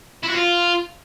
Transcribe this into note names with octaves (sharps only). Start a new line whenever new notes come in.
E4
F#4
F4